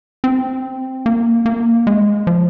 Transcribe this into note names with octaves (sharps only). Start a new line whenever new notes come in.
C4
A#3
A#3
G#3
F3